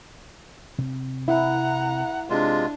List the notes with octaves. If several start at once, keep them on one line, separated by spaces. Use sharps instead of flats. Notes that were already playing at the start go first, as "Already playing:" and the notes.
C3 C4
E4 F#5 A#5
C3 G#3 D4 F4